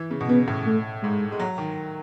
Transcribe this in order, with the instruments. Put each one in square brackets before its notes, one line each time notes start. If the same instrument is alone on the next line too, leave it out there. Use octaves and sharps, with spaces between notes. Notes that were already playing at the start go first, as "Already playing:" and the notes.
Already playing: [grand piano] E3
C#3
B2
[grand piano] C#3 [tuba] B3
[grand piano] A2
[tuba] A3
[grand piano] G#2 [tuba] G#3
[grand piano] G#3
F#3
D#3